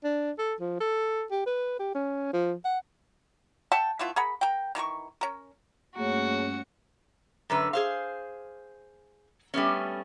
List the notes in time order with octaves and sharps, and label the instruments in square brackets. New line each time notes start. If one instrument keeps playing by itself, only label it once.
[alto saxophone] D4
A4
F3
A4
G4
B4
G4
C#4
F3
F#5
[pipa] E5 F#5 G5 A5
A3 B3 E4 F4
G#4 A#4 F#5 B5
A#4 G5
D#3 E3 A#4 C#6
C#4 A#4
[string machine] G2 C#4 C#7 [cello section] A3 [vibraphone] A#3 G#4 C#5 [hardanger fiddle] F#4
[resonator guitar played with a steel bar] F#2 D3 B4
G#4 C5 F5
G3 A3 B3 C#4